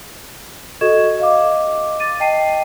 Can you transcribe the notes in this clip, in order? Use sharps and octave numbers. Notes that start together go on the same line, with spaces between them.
F#4 A4 D#5 C#6 G#6 E7
D#5 F5 D6
D6 A6 D#7
D#5 G5 A5 C7 D#7